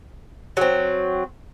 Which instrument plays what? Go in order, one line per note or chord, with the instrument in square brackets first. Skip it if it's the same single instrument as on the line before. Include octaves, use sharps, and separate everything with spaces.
[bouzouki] F#3 C4